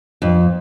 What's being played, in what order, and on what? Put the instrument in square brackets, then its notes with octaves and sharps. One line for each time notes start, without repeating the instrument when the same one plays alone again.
[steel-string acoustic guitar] F2